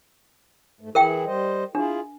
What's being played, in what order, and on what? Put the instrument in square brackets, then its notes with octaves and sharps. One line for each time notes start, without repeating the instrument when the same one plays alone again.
[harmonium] G#2 A3
[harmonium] E3 E4 G#4 [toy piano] A#4 E5 G5
[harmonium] G3 C5 D#5
[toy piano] D4 [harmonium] E4 F4 G#4